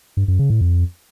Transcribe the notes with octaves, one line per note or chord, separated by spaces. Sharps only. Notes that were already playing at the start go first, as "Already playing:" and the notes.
G2
F#2
C#3
A2
F2